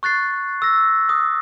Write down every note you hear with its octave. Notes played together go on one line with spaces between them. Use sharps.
C#6 F#6 A6 C7
E6 A#6
D#6